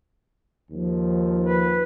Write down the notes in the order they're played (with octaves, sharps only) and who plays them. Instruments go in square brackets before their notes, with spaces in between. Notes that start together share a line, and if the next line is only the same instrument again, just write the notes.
[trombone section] D#2 F3
[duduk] B4